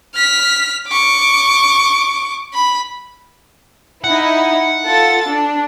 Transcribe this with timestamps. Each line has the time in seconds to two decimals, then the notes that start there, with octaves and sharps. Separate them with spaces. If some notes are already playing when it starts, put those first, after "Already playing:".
0.15 F6 B6
0.88 C#6 D6
2.54 B5
4.04 D#4 E4 F#5
4.84 F4 A4 A6
5.28 D4